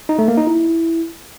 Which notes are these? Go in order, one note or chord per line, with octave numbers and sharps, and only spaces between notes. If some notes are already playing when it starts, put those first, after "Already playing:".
D#4
A3
A#3
D#4
E4